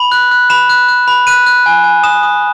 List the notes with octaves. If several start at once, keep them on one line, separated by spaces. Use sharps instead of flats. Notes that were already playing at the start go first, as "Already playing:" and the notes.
Already playing: B5 F#7
F#6
F#6
B5 E7
F#6
F#6
B5
F#6 D#7
F#6
G#5
G#5
D#6 E7
D#6